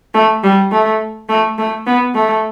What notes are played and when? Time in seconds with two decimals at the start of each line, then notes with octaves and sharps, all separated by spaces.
0.14 A3
0.44 G3
0.72 A3
1.29 A3
1.58 A3
1.87 B3
2.15 A3